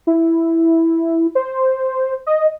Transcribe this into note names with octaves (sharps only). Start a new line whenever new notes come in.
E4
C5
D#5